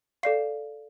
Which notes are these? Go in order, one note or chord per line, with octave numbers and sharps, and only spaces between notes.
A4 D5 F5 C7